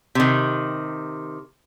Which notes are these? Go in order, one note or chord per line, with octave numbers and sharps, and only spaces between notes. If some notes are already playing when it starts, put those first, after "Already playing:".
C3 D#3